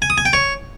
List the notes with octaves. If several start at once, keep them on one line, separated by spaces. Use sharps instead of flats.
G#5
D#6
G#5
G5
C#5